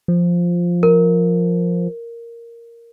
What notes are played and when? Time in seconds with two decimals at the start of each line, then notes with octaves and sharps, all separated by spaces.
0.08 F3
0.83 A#4